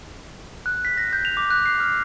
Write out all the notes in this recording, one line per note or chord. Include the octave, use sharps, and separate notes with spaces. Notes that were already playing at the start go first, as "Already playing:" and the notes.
F#6
B6
A#6
G6
F7
D6
F#6
C7
F6